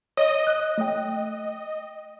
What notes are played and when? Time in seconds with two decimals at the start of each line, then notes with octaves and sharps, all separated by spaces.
0.17 C#5 D#5
0.47 F#6
0.78 A3 G5